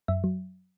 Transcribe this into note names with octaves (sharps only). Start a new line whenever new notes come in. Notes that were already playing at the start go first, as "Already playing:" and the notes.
F#2 E5
F#3